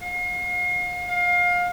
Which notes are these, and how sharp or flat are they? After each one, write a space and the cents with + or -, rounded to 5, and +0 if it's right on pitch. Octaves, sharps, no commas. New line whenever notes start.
F5 +40
F5 +25